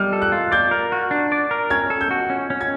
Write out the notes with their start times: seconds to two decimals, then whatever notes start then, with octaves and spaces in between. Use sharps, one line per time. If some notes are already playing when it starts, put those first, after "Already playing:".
Already playing: G3 F6
0.13 A4
0.22 F#6
0.32 F4
0.52 D5 G6
0.71 A#4
0.92 F#4
1.11 D4
1.32 D5
1.51 A#4
1.70 C#4 G#6
1.90 A4
2.01 G6
2.11 F#4
2.30 C#4
2.50 C#4
2.61 G#6